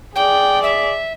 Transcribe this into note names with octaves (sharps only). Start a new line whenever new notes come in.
G#4 D5 G5
E5